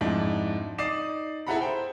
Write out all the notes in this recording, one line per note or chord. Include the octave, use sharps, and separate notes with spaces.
F2 G#2 D4 E4
D#4 D5 D#6 C7 E7
E4 G#4 A4 F#5 A#5 B5
C5 G5